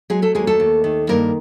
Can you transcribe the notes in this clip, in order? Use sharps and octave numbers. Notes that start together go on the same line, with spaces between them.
F#3 G#3 G#4
A3 A4
D#2 G#3 G#4
A3 A4
D#2
D#3
G2 A#3 A#4